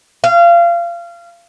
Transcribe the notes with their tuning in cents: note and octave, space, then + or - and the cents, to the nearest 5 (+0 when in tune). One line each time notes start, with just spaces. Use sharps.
F5 -25